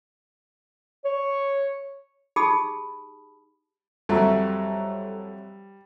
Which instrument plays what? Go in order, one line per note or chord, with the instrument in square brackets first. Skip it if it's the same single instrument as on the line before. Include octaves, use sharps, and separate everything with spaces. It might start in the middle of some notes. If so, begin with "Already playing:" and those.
[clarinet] C#5
[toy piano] D#4 G4 G#4 A5 B5 D#6
[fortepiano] F2 F#3 A3 [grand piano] G3 [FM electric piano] A4 C#5 A#5